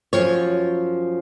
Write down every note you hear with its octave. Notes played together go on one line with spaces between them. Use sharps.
F#2 C#3 F3 C#5